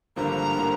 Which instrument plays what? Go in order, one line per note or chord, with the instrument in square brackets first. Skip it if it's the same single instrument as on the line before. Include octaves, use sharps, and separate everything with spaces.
[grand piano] G#1 G2 D3 F3 A#3 [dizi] A#5
[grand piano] D3 F3 A#3